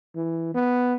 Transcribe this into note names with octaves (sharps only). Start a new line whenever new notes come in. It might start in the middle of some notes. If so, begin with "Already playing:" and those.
E3
B3